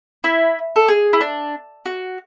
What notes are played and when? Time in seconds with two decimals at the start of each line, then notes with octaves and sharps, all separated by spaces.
0.24 E4
0.76 A4
0.88 G#4
1.13 E4
1.21 D4
1.86 F#4